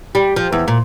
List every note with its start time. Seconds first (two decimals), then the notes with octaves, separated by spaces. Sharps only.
0.15 G3
0.36 F3
0.52 E2
0.68 A#2